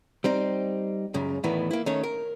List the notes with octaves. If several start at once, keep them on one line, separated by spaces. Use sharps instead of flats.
G3 C4 D#4
C#2 F#2 C#3
E2 A2 D#3 E3 B3
A#3 E4
D#3 A3 C#4 C#5
A#4